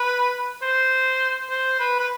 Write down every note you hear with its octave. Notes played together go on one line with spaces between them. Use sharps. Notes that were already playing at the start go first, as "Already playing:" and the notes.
Already playing: B4
C5
C5
B4
B4